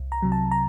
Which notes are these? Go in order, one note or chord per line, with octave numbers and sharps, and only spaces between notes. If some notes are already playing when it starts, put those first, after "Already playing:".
Already playing: C2
A#5
C3 F#3
A5
A#5